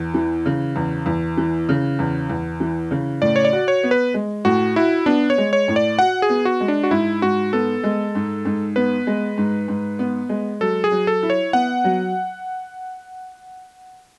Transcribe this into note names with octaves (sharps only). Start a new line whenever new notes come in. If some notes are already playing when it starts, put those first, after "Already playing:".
Already playing: E2
E3
C#3
E2
E2
E3
C#3
E2
E2
E3
C#3
A2 D5
C#5
D5
F#4
C#5
B3
B4
G#3
A2 F#4
E4 F#4
B3 D4
C#5
G#3
C#5
A2
D5
F#4 F#5
G#4
B3
F#4
G#3
D4
F#4
G#2 E4
G#2 F#4
B3 A4
G#3
G#2
G#2
B3 B4
G#3
G#2
G#2
B3
G#3
F#3 A4
G#4
F#3
A4
E4
C#5
B3 F#5
F#3